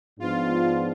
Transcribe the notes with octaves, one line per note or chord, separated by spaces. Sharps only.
G#2 F3 G#3 B3 D4 F4